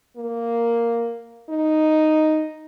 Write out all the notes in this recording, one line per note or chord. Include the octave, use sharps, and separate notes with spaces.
A#3
D#4